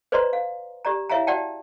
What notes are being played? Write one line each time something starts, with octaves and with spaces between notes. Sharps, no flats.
B4 C5 D5 D#5 A#5 C6
F5
G4 D5 A#5
E4 C#5 E5 F5 G#5 A#5
F#4 D5 F#5 G5 A5